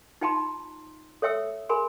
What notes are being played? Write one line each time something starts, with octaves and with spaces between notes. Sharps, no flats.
D#4 F4 G5 A5 A#5 C6
A4 C#5 E5 G5 E6
G#4 A#4 G#5 B5 C6